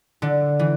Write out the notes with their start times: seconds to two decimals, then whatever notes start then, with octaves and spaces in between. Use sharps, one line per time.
0.22 D3
0.59 E3